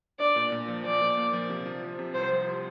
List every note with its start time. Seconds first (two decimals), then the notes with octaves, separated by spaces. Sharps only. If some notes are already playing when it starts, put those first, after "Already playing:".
0.19 D4 D5
0.36 A#2
0.52 A#2
0.68 F3
0.84 F3 D5
1.01 A#2
1.17 A#3
1.33 F3
1.50 C3
1.66 F3
1.83 F3
1.99 C3
2.14 C2 C5
2.31 F3